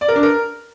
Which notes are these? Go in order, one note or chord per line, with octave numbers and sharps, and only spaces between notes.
D5
A#4
D4
A#4